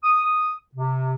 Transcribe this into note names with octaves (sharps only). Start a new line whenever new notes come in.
D#6
C3